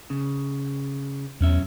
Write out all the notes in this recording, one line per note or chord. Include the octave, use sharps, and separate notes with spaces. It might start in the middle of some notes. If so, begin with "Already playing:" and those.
C#3
B1 E2 C#4 E5